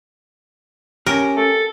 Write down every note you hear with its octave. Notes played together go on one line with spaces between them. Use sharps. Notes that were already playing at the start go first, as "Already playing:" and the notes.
C#4 G4 A#4
A4